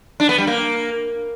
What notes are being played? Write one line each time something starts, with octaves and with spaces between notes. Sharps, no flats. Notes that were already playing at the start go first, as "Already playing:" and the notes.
D4
B3
G3
A#3